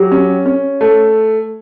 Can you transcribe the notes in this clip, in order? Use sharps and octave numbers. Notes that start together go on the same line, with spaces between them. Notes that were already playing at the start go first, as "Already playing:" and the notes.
Already playing: F#3 G4
C#4
C#4
A3